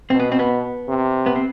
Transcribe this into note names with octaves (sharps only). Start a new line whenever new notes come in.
B2 C4
B3
C4
B3
C3
B3
C4